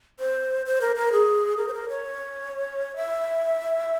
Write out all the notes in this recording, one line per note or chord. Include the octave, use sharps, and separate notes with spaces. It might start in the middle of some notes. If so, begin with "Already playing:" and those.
C5
C5
A#4
A#4
G#4
A#4
C5
A#4
C#5
E5